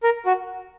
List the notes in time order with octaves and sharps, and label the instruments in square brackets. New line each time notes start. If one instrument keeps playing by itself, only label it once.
[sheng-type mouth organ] A#4
F#4